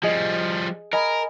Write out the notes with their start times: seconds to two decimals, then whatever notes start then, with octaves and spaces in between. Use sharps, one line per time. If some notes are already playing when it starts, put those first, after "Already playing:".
0.03 F3 G3 G#4 D#5
0.93 A#4 D#5 G#5 B5